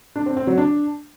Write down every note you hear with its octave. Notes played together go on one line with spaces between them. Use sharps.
D4
C4
C4
F#3
D4